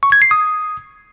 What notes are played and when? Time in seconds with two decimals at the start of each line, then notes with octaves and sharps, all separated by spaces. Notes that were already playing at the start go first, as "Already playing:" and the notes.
0.03 C#6
0.12 G#6
0.22 C7
0.31 D#6